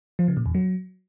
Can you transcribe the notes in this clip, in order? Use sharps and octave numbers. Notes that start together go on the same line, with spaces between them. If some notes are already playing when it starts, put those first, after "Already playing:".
F3
C#3
A#2
E2
F#3